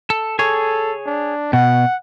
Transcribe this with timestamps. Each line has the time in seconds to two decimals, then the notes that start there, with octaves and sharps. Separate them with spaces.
0.10 A4
0.39 G#4 A4 C#5
1.06 D4
1.53 B2 F#5